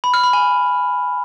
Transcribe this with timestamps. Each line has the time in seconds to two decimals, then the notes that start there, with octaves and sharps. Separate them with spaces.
0.04 B5
0.14 F6
0.23 B5
0.33 G#5